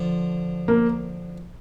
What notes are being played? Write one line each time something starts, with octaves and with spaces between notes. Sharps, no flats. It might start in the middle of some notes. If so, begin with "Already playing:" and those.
Already playing: D3 F3
A#3